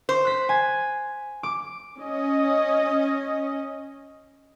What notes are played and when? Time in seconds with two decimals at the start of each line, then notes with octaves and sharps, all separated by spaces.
0.09 C5
0.25 F#6 B6
0.49 G#5
1.43 D6
1.99 C#4 D#5